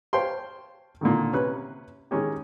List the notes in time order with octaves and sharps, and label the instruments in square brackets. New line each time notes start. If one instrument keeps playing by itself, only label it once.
[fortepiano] C5 C#5 F5 G5 A5 C6
A#2 D3 D#3
C3 C#4 B4 F#6
D#3 G#3 C#4 G4